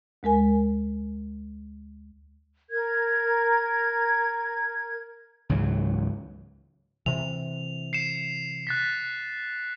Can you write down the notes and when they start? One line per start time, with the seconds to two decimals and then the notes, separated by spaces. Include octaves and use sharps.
0.23 D2 G#3 A#4 G#5
2.71 A#4 G#6
5.49 C#2 G#2 E3 F#3
7.06 C3 E3 F7
7.93 C7 C#7 E7
8.67 F#6 A6 B6